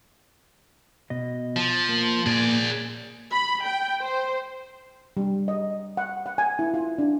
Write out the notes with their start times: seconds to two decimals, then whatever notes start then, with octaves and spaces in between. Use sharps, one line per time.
1.10 B2 D#5
1.56 F3
1.89 A#3
2.26 A#2 A#3 G#4 D5
3.31 B5
3.66 G5
4.02 C5
5.17 G3
5.48 D#5
5.97 F#5
6.26 F#5
6.38 G#5
6.59 E4
6.74 F4
6.98 D4